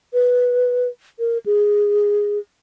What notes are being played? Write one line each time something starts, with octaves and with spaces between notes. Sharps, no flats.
B4
A#4
G#4